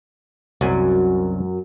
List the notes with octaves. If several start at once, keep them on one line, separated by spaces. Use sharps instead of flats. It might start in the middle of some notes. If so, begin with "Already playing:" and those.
C2 F#2 F#3 G#5